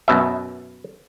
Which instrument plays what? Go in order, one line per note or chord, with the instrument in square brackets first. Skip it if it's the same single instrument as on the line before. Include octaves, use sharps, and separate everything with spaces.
[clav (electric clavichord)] F#2 B2 E5